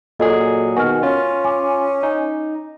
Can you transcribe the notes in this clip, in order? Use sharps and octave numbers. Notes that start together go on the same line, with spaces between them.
A#2 F#3 F4 G#4 A4 D#5
B2 D#3 F#4 G#5 F6
C#4 F4
G#5 D6
D#4